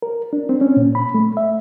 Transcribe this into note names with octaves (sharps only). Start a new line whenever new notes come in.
A#4
D4
C4
C#4
A#2
B5
A3
E5